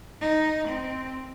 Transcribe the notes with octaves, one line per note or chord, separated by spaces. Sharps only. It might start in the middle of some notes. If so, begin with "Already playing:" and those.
D#4
C4